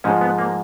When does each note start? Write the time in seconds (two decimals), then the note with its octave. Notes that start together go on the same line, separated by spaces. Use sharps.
0.04 G#2 F3 G#3 C#4
0.21 B3
0.39 A#3